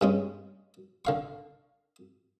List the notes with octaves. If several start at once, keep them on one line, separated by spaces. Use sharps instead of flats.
G2 G#3 C#4
D3 F5 C#6